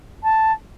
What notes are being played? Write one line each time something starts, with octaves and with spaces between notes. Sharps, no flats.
A5